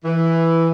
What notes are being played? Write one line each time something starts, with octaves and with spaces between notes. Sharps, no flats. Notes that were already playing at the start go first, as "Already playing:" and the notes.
E3